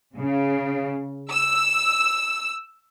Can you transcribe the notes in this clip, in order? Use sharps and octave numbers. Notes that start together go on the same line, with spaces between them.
C#3
E6